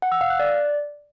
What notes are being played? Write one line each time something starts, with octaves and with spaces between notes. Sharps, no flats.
F#5
E6
F5
F#6
D5